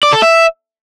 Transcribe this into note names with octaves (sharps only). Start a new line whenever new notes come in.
D5
A4
E5